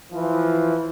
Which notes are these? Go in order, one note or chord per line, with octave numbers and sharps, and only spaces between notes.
E3 F3